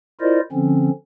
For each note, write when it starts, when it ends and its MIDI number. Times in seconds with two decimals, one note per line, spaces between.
0.21 0.40 64
0.21 0.40 65
0.21 0.40 70
0.21 0.40 72
0.21 0.40 74
0.21 0.40 75
0.52 0.90 50
0.52 0.90 53
0.52 0.90 60
0.52 0.90 61